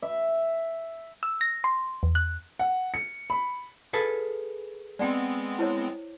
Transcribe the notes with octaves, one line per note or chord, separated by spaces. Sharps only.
E5
E6
A#6
C6
E2
F#6
F#5
C#7
B5
G#4 A4 B4 F5 D#6
G#3 B3 C4 D5 F#5 G5
E4 C5 C#5